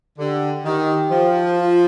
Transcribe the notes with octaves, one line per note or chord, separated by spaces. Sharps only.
D3 G4
D#3 G4
F3
F4